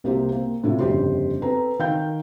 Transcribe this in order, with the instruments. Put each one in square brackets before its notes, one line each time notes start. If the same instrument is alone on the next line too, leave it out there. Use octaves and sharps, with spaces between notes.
[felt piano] C2 C3 A#3 G4 C5
A#3 C4
A2 C3 F4
G1 F2 C#3 G4 C5 C6
C4 A4 B4 A#5
D#3 F5 G5 G6